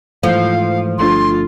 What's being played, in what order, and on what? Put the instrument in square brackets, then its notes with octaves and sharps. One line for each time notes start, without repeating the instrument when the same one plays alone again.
[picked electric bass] G#2 E3 A3 [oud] F3 [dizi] F5
[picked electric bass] G1 A3 D4 [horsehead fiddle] F4 [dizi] C6